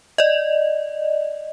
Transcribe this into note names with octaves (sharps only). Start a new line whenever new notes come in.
D5 D#5